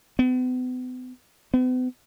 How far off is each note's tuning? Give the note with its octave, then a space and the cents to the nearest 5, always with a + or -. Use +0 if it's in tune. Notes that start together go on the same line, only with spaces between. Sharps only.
B3 +40
B3 +45